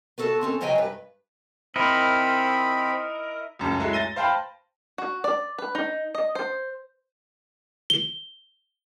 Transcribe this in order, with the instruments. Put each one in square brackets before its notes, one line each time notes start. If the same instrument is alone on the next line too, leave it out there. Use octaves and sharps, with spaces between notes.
[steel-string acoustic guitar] B3 F#4 A4 A5
C4 C#4 A4
C#3 F#3 C#5 D#5 G5 G#5
G2 B4
[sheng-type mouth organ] C4 B5 [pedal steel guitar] D#4 E4 A#4
[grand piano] C#2 F#2 C#4 A5
F#3 G#3 A3 E4
A6 A#6 D#7 G7
C5 F5 G5 A5 B5
[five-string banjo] F#4
D5
B4
D#4
D#5
C5
[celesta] G7